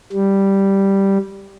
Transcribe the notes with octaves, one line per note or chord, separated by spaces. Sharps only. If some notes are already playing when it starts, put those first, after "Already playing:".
G3